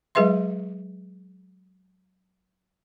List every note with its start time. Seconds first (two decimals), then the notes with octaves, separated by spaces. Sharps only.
0.15 F#3 G#3 G#4 B4 E5 C6